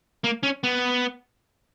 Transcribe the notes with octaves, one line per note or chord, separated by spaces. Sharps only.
A#3
C#4
B3